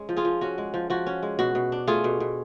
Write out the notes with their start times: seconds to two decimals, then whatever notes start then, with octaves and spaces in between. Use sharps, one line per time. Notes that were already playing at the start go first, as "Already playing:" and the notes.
Already playing: G#3 C#4
0.09 F3
0.17 F4 G#4
0.25 F3
0.41 C#4 F#4
0.58 G#3
0.74 F3
0.90 F3 F#4
1.07 C#4
1.23 G#3
1.39 B2 F#4
1.55 B2
1.72 D4
1.87 A3 F4 G#4
2.04 B2
2.20 B2